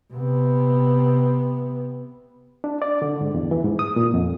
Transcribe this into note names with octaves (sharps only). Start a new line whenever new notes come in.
C3 B3
D4
D5
D3
G#2
E2
E3
G#2
D#6
A#2
F2